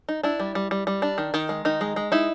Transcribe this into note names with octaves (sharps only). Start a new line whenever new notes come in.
D#4
D4 E4
G3
G3
G3
G3
D4
D#3
D#3
G#3
D#3 D#4
G#3
G#3
D#4 E4